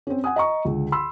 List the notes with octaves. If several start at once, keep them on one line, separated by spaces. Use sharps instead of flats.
C4 C#4
F#5 G#5 D#6
D#5 A#5 C#6
C#2 D3
B5 C6 E6